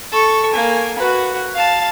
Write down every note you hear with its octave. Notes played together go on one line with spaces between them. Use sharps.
A4 C#6
A#3 G#5
F#4 B4
F5 A5